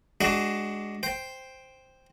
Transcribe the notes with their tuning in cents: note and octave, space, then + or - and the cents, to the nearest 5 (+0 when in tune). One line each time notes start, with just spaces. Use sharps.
G#3 +0 D4 +0 F#4 +20
C5 +0 G5 +5